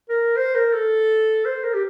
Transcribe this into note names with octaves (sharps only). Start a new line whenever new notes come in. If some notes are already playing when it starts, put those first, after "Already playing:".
A#4
C5
A#4
A4
C5
A#4
G4